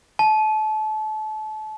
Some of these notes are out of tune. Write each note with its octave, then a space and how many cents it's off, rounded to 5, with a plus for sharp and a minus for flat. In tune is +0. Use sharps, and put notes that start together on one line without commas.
A5 -30